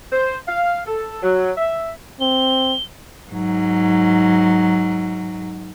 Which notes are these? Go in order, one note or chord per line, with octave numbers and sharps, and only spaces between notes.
C5
F5
A4
F#3
E5
C4 G7
G#2 F#3